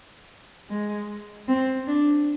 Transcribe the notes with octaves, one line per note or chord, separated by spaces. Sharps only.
G#3
C4
D4